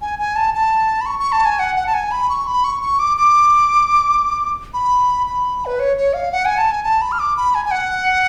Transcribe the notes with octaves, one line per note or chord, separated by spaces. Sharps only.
G#5
G#5
A5
A5
B5
C#6
C#6
A5
G#5
F#5
F#5
A5
G#5
B5
C#6
B5
C#6
C#6
D6
D6
B5
B5
B4
C#5
C#5
F5
F#5
G#5
A5
G#5
A5
B5
F6
D6
B5
G#5
G#5
F#5